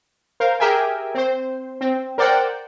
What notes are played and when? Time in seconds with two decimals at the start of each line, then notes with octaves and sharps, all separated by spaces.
0.40 A#4 C5 F5
0.60 G4 G#4 A#4 E5 G5 G#5
1.14 C4 C5
1.81 C4
2.18 A#4 C5 D5 F#5 G5